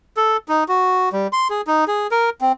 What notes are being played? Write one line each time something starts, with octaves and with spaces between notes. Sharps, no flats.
A4
D#4
F#4
G3
C6
G#4
D#4
G#4
A#4
C4